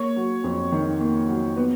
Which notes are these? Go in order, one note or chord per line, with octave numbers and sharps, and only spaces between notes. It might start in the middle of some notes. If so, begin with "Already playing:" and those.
Already playing: A#3 C#5
F#3
F2
D#3
A#3
F#3
B3